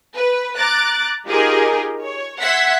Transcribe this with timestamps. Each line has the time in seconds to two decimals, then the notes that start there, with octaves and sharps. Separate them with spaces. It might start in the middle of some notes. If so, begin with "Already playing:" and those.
0.16 B4
0.58 A#5 D6 F#6 A6
1.27 D#4 F4 G4 G#4 A#4
2.03 C#5
2.41 E5 F#5 C6 G#6 B6